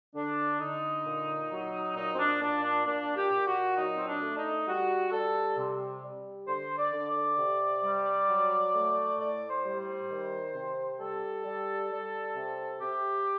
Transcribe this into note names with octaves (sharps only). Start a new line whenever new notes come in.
D3 D4
D3 D#4
A#2
F#3
A#2 D#4
C4
D4
A#2 D4
D4
A#2 D4
G4
A#2
F#4
F#3 D#4
C4
D4
A3
D#4
G3 F#4
G3 A4
C3
G3
D3 C5
D5
D3
D5
C3
G3
F#3
A3
A2 D5
C5
G3
C5
D#3
C3
G3 A4
G3
G3
C3
C3 G4